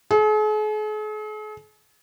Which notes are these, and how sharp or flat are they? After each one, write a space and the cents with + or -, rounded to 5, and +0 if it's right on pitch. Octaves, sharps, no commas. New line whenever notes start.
G#4 +45